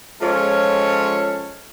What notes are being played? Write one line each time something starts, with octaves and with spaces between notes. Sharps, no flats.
F3 G#3 C#4 A4 C#5